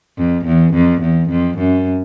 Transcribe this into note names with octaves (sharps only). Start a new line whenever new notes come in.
F2
E2
F2
E2
F2
F#2